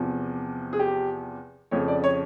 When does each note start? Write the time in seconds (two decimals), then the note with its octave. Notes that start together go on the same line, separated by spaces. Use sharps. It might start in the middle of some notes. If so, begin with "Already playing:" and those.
Already playing: E2 C3 F3
0.73 G#4
0.80 G4
1.71 F2 C#3 F3 C#5
1.88 D5
2.04 C#5